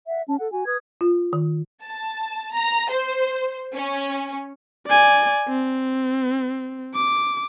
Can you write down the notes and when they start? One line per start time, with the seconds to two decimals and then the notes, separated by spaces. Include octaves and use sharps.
0.08 E5 F#5
0.28 C#4 A5
0.39 A4 F#5
0.51 F#4 G#5
0.65 B4 D#6 G#6
1.01 F4
1.33 D#3
1.83 A5
2.53 A#5
2.90 C5
3.74 C#4
4.87 D5 G#5
5.48 C4
6.95 D6